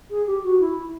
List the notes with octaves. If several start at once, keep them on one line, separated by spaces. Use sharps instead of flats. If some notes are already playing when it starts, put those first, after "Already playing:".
G#4
G4
F#4
E4